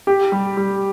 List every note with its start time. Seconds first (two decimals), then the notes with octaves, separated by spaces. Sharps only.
0.07 G4
0.32 G3
0.57 G3